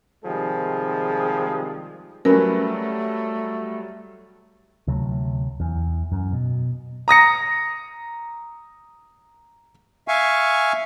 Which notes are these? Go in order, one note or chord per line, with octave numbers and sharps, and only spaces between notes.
C3 D#3 F3 G3 G#3 G#4
F#3 G3 A3 C#4 A#4 B4
D2 C3 F#3 A3
E2
F#2
B2
A#5 D#6 A#6 C#7
E5 F5 G#5 C#6